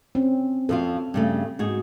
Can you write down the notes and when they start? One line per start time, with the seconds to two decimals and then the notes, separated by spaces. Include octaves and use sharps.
0.15 C4 C#4
0.69 F2 F3 F4 A4
1.14 G2 C#3 A3
1.59 G#2 F#4 G#4